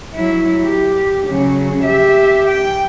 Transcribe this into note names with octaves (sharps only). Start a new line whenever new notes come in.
F#3 E4
G4
C#3 F#3
G4 E5
G5